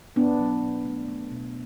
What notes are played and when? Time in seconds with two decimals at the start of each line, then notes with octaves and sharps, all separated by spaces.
0.16 B2 B3 D4
0.40 F#3
0.62 B2
0.85 A3
1.08 A3
1.32 B2